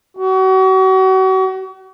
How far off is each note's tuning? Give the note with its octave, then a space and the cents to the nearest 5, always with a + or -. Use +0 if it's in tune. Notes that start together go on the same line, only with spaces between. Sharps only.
F#4 +35